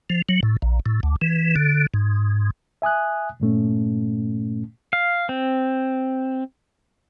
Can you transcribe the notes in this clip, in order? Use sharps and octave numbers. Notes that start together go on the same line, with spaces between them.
F3
F#3
A2
A#1
A2
D2
E3
D3
G#2
E5 G#5 D#6 F#6
G2 A#2 A3 C#4
F5
C4